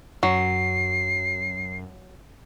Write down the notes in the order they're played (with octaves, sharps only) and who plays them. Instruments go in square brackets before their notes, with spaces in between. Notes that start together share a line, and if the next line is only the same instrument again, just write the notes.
[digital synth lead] F#2 [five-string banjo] F#3 [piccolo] C7